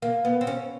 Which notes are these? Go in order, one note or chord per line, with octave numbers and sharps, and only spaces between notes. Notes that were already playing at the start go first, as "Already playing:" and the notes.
A#3
B3
C4
C#4